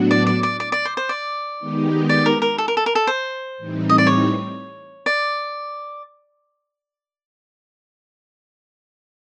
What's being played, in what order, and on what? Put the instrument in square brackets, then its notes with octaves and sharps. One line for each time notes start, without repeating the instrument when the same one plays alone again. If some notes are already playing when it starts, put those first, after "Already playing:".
Already playing: [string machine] A2 F#3 B3 D4 F#4
[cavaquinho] D5
D5
D5
D5
D5
C5
C5
D5
[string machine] D#3 G#3 B3 D#4 G4
[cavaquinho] D5
A#4
A#4
A4
A#4
A4
A#4
A4
C5
[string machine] A2 E3 G3 C4 D#4
[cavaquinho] D#5
D5
C#5
D5